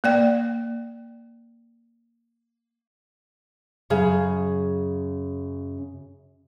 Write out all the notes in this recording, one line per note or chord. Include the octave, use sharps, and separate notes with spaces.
A#3 D5 G5
F#2 C#3 G#4 F5